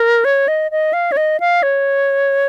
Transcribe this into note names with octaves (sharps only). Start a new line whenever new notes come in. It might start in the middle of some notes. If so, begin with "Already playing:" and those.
Already playing: A#4
C#5
D#5
D#5
F5
C#5
D#5
F5
C#5